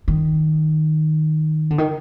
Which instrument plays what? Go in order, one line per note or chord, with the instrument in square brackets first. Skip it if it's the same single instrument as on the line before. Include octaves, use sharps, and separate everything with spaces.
[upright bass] D#3
D3
D#3